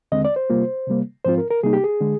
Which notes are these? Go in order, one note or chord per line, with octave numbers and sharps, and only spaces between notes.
D#2 D3 G#3 C4 D#5
D5
C5
C3 G3 A#3 F4
C3 G3 A#3
G#2 F3 C4 F4 C5
A#4
A#4
C3 G3 A#3 D#4 G#4
G4
G#4
D3 G#3